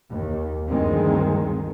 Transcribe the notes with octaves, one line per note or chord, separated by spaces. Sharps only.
D#2
D2 G2 D#3 F3 G#3 C4